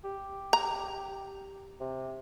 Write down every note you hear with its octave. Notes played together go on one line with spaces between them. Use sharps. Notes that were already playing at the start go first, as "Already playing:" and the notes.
G4
A#5
C3